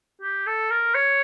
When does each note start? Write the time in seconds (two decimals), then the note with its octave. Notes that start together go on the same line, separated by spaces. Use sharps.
0.22 G4
0.47 A4
0.70 A#4
0.95 C#5